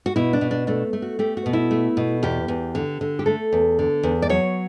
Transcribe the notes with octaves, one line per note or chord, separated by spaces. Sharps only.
F#4
B2 E4
D4
B2
D4
A3 D4
A3
F#4
A3 G4
F#4
B2
E4
A3
B2
E2 G4
E2
D3
D3
G4
A3 A4
E2
D3
E2
D5
F#3 C#5